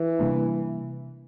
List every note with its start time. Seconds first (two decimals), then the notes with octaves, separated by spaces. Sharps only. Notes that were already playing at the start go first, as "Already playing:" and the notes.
Already playing: E3
0.19 C3 G3 A#3 D4